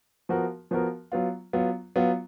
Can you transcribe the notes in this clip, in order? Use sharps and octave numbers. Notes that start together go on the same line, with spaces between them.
F3 B3 F#4 A#4
F3 B3 F#4 A#4
F#3 B3 F4
F#3 B3 F4
F#3 B3 F4